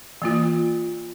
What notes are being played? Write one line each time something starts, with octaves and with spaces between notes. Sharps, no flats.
E3 A#3 F4